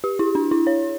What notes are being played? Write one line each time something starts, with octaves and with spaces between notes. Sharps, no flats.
G4
E4
D4
E4
C#5